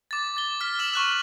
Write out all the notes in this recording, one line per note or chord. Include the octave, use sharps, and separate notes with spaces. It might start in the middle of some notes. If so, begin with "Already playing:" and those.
D6 A6
A6 G7
F6 B6
E6 E7 F#7
C#6 F#6 E7